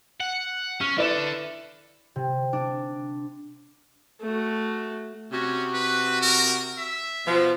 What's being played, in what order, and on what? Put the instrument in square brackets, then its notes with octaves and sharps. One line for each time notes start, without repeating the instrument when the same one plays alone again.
[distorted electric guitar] F#5
[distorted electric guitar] C#4 [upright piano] F6
[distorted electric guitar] D3 A4 [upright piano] E4 B4 D5
[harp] C3
D4
[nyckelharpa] A3 F#4
[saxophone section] C3 F#4 [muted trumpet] C#4
[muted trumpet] B4
A#4
E5
[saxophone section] B2 F3